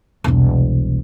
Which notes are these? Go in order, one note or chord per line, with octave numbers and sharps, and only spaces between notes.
E1 C2